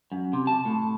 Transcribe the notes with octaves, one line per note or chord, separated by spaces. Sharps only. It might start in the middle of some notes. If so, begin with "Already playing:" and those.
F#2
C3
A5
A2